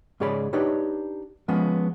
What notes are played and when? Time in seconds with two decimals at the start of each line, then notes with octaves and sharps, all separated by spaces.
0.20 G#2 C#3 G#4 C#5 D5 B5
0.53 D4 D#4 G4 B4 C#5 D5
1.48 F3 G#3 B3 C#4